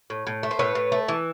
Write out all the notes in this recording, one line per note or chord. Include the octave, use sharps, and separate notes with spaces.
A2
A2
A3
C5
A2 B4 C#5
A2
A3
E3